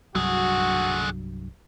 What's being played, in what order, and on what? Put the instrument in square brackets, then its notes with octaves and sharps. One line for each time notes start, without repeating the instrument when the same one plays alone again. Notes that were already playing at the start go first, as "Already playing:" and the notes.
[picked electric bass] C2 G2 F#3 [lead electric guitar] D3 G#4 [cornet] F#4